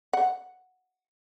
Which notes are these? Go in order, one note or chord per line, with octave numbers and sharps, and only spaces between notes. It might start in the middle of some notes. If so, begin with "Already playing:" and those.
F#5